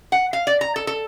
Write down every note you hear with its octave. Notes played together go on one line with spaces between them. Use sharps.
F#5
F5
D5
A#5
A4
A4